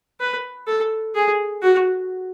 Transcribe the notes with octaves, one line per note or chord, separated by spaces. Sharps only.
B4
A4
G#4
F#4